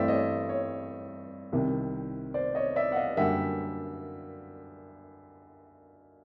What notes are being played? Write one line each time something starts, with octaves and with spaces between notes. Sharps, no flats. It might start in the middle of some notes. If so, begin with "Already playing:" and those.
Already playing: G2 E3 A3 C4 D5 E5
C#5 D#5
C#5
C2 C3 D#3
C5 D5
C#5 D#5
D5 E5
F#5
D#5 F5
F#2 D3 G3 A#3 E5 F#5